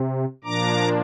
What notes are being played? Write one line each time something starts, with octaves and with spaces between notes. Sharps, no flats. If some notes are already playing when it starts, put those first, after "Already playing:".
Already playing: C3
A#2 F3 A#3 D4 A#5 D6